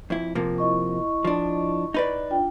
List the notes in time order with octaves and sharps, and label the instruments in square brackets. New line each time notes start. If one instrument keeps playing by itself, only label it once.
[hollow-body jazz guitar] F2 E4
C3 F3 A#3
[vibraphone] E4 D#5 C#6
[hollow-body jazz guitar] F3 D4
D#4 B4 D5
[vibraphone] D4 F4 G5